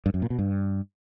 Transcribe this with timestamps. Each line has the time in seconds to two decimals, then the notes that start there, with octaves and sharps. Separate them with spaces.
0.06 G2
0.14 F#2
0.22 A#2
0.30 B2
0.39 G2